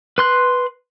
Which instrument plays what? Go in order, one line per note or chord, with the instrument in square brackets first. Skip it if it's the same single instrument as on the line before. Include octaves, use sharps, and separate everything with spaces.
[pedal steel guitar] B4 C6 F#6